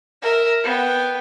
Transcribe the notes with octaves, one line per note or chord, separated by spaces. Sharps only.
A#4 E5
B3 G5